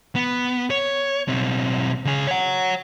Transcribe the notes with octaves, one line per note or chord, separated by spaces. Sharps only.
B3
C#5
B1 C4
C#2 G#4
C#5 F#5